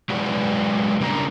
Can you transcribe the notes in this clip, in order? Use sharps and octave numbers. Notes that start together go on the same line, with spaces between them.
F#3 G#3 F#4 G#4 B4 D5
C#3 G3 A#3 D4 A#5